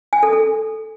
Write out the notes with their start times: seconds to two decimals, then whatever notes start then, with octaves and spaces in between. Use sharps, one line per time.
0.13 G#5
0.23 A4
0.33 A4